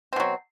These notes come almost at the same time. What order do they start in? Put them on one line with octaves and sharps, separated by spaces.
C4 B2 F#3